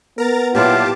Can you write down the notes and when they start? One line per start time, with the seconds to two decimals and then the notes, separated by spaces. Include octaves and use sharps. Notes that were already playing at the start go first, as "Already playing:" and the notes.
0.18 B3 A#4 A#5 A6
0.55 A#2 F#3 E4 F4 G4 A5 D6